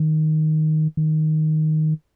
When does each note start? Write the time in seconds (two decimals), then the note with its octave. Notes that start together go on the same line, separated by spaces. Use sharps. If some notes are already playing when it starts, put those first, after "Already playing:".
Already playing: D#3
0.97 D#3